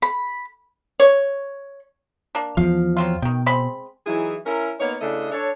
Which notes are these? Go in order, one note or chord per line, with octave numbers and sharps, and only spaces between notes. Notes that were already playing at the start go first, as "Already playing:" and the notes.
B5
C#5
A#3 D4
E2 F3 F5
F#3 C4 F4
B2 D#3 G5
G#3 C4 B5
E3 F#3 D#4 E4 G#4
C#4 E4 A#4
A#3 B3 D#4 C#5
C#3 A3 D4 E4 D#5
D4 A4 C#5